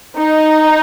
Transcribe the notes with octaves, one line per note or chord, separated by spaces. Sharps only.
D#4